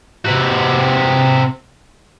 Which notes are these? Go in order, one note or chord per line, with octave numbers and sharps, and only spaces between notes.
C3 F#4